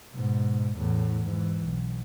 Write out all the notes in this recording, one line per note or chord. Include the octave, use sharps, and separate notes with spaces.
G#2 B2
E2 A2
G#2 E3
B1